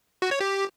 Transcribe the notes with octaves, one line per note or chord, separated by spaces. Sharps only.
F#4
C#5
G4